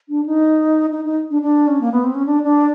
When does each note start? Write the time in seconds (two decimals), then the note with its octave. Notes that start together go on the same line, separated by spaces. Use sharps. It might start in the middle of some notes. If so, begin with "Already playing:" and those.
0.09 D4
0.26 D#4
0.92 D#4
1.05 D#4
1.30 D4
1.42 D4
1.67 C#4
1.81 A#3
1.92 B3
2.04 C4
2.15 C#4
2.26 D4
2.43 D4